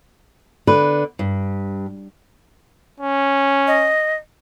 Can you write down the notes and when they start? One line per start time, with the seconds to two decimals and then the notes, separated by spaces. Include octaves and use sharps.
0.67 D3 B4
1.19 G2
3.00 C#4
3.67 D#5